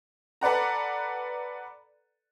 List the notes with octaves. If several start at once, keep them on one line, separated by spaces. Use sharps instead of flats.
A4 B4 D5 F#5 A#5